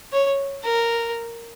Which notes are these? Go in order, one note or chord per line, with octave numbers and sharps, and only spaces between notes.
C#5
A#4